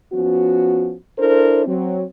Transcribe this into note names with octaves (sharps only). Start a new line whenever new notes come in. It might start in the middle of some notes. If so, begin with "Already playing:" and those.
F3 B3 C#4 F#4
D4 E4 A4 A#4 C5
F#3 C4